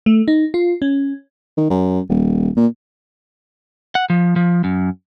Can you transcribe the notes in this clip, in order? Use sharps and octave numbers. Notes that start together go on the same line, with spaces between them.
A3
D#4
F4
C#4
D#3
F#2
D#1
A#2
F#5
F3
F3
F#2